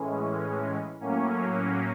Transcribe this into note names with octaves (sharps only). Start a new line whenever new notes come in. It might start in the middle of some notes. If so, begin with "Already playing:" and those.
Already playing: A2 E3 G#3 C#4
A2 F#3 A#3 C#4